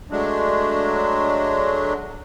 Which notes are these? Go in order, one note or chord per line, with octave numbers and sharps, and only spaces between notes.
F#3 G#3 A3 D4